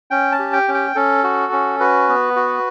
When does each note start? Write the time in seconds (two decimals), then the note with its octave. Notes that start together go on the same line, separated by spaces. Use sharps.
0.11 C#4 G5
0.32 A5
0.39 G4
0.53 G5
0.68 C#4
0.74 G5
0.95 C#4 A4
1.24 F#4
1.52 C#4
1.80 F#4 B4
2.09 B3
2.36 F#4